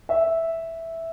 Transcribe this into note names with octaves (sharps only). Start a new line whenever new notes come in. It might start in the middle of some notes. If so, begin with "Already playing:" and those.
E5